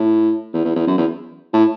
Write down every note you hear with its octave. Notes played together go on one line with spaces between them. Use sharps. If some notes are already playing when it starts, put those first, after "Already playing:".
Already playing: A2
E2
E2
E2
F#2
E2
A2